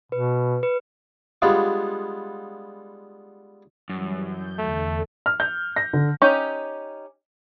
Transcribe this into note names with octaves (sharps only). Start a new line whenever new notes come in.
B2 B4
B4
G3 G#3 B3 D4 F4
F#2 E3 G3
G6
E2 D3 A3 A4
F6
G6
A#6
D3
C#4 D#4 G4